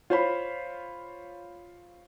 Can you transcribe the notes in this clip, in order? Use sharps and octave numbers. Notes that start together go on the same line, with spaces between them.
F4 C5 C#5 B5